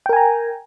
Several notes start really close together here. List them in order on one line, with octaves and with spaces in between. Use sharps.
G5 A#4 G#5 A#5